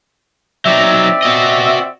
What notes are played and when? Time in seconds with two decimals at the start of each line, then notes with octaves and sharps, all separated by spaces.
0.66 F#3 C4 D#4 D5 E5
1.23 F#4 D#5